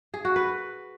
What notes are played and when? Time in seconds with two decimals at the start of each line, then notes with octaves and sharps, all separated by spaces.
0.14 G#4
0.25 F#4
0.36 B4